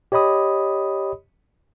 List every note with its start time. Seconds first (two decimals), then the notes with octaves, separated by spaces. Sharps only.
0.12 G4 C#5 D#5 B5 D#6